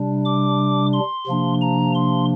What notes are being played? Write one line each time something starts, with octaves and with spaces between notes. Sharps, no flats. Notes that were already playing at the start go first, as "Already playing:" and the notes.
Already playing: C3 G3 D4
D6
C6
C3 F3 A#3 D4
A#5
C6